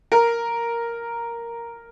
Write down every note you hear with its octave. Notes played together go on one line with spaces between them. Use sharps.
A#4